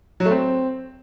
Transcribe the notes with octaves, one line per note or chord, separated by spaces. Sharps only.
F#3
A3
C4